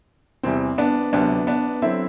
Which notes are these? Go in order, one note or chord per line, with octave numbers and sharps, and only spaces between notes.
E2 C3 E3 G3 C4
B3 D4
D2 C3 F#3 B3 D4
B3 D4
D3 F#3 C4 E4